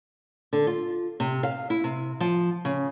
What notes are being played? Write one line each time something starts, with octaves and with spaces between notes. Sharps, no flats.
D3
F4
C3
F5
E4
C3
F3
C#3